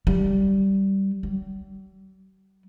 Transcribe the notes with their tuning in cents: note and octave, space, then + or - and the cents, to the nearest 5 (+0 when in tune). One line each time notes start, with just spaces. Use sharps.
G3 -10
G3 -45